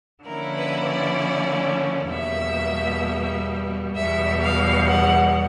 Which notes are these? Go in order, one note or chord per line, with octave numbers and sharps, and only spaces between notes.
D3 F3 A#3 C#4 E4 A#4
B4
D5
E2 B2 G3 A#3 E5
E2 B2 G3 E5
F5
F#5